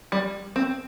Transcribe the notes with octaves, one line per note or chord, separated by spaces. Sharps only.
G3
C4